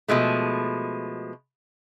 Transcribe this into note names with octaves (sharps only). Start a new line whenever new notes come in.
B2 F3 G#3 A3